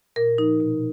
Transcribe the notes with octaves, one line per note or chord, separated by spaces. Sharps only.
A#2 A#4
F3 D#4
B2